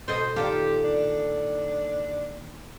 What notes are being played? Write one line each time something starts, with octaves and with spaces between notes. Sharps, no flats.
B2 A4 C5 D#5
A#2 D#3 F4 G4 A4
D4